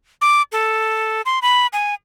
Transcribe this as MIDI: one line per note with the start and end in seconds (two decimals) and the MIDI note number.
0.21 0.42 86
0.52 1.21 69
1.26 1.39 84
1.42 1.67 83
1.73 1.94 80